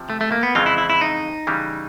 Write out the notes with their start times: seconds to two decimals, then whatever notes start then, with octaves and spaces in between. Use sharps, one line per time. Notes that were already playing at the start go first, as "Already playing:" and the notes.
Already playing: C3 F3
0.10 A3
0.21 A3
0.32 A#3
0.43 B3
0.55 F2 C#3 E3 G#3 C4 F4
0.66 E4
0.78 E4
0.90 E4
1.01 D#4
1.47 C#3 E3 G3